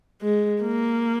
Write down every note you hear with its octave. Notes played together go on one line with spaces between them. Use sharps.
G#3
A#3